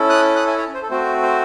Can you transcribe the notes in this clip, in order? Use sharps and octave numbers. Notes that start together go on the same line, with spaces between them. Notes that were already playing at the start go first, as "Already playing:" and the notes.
Already playing: C#4 E4 A4
D#6 F#6
D#6 F#6
E5 G#5
C#5 E5
C5
A4
A3 C4 F#4 C5
C5